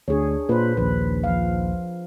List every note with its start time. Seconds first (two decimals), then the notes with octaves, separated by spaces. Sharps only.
0.08 D2 D4 G#4 C#5
0.49 A#2 B4 C5
0.77 A#1 D#2 B4
1.24 F3 F5